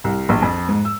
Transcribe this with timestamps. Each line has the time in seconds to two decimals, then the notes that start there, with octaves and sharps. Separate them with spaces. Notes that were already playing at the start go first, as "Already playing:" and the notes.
0.04 C2
0.29 A#1
0.42 F2
0.69 G#2
0.85 E6